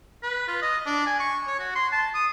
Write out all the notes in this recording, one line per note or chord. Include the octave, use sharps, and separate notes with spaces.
B4
F4
D#5
D4
G#5
C#6
C#5
F#4
C6
A5
D#6